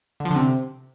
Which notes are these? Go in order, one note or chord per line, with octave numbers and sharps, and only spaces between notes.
D3
F3
D3
C3